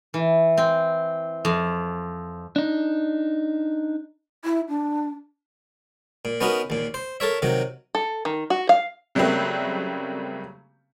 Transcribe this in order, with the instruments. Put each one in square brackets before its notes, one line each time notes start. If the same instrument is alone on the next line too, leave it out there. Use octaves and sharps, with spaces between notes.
[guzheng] E3
C4
F2
[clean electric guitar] D4 D#4
[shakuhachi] E4
D4
[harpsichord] A#2
B3 C#4 D#4 F#4 A#4
D#2 A#2
C5
A4 A#4 C#5 E5
C3 D#3 F#3
[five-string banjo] A4
D#3
F#4
F5
[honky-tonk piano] C#3 F#3 G3 A3 A#3 C4